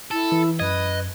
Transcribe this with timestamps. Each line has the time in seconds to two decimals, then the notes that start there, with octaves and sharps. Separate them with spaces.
0.11 E4 A4
0.32 E3
0.60 F#2 B4 D#5 G#6